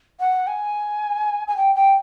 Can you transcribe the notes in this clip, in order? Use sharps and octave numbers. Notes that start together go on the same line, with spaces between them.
F#5
G#5
G#5
G5
G5